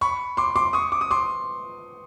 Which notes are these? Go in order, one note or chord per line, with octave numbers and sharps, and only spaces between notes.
B5 C#6
C6 D6
C6 D6
C#6 D#6
D6
D#6
C6 D6